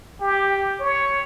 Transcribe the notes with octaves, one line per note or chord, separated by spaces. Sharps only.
G4
C#5